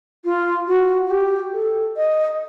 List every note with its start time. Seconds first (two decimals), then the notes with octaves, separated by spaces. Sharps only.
0.25 F4
0.68 F#4
1.07 F#4
1.11 G4
1.53 A4
1.97 D#5